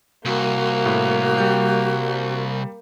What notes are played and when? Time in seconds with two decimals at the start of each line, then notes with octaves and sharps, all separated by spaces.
0.25 C2 A#3 F#4
0.86 A2
1.38 G3 G6